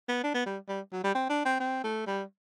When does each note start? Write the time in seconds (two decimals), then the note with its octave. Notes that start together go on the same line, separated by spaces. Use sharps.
0.09 B3
0.23 D4
0.34 B3
0.46 G3
0.69 G3
0.92 F#3
1.04 G3
1.15 C4
1.29 D4
1.45 C4
1.60 C4
1.84 A3
2.07 G3